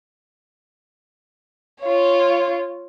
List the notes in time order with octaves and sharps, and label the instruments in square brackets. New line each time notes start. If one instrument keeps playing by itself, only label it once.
[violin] F4 C#5